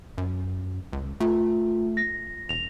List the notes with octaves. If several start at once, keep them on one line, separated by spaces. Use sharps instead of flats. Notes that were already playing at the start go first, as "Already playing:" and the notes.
F#2
C#2
A3 F4
A#6
E1 F7